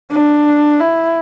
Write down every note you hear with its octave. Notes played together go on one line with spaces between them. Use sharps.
D4
E4